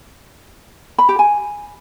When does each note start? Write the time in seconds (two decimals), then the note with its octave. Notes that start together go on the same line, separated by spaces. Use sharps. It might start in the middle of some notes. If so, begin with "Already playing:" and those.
0.98 B5
1.09 G4
1.19 G#5